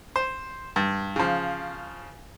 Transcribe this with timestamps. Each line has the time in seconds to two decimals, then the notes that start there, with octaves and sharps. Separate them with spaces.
0.16 C5
0.76 G2
1.16 C#3 F3